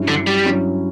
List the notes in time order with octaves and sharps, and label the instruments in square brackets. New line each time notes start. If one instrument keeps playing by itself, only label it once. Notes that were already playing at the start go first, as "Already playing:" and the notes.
Already playing: [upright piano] G2 F#3 C#4 E4
[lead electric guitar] D3
G3
[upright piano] G2 F#3 C#4 E4